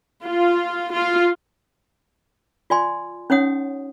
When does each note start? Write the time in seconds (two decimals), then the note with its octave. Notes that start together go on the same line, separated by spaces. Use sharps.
0.25 F4
0.93 F4
2.70 F4 D5 G#5 C6
3.30 C#4 D#4 C#5 F#5 D#6